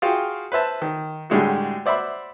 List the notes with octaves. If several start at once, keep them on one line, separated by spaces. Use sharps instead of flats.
F4 F#4 G#4 F5 G5
B4 C5 E5 A5
D#3
A2 D3 G3 G#3 E4 F#4
C5 D5 E5 F#5 B5 C6